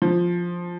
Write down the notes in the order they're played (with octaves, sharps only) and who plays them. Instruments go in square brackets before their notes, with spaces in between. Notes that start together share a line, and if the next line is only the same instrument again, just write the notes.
[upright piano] F3